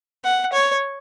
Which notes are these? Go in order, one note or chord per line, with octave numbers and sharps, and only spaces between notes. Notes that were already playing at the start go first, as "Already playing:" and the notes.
F#5
C#5